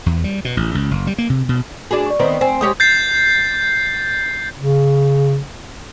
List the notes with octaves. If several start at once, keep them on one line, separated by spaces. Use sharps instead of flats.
E2
G3
B2
A1
C#2
F#1
G3
A#3
C3
B2
D4 F#4 G#4
D5 C#6
D#3 B3 C4
C4 G#5
G#3 G4 C#5 D#6
G6 A6 C7
C#3